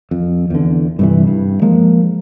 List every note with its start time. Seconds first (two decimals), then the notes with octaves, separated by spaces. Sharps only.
0.11 F2
0.50 E2 D3
0.99 G2 C3 E3
1.27 G2
1.62 F3 G#3 A#3